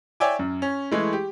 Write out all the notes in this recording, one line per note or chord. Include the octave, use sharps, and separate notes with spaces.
C#5 D5 E5 G5 G#5 D6
F#2
C#4
E3 G#3 A3
G4